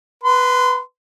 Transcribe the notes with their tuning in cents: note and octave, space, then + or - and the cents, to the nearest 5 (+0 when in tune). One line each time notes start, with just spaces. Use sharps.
B4 +0 C6 -25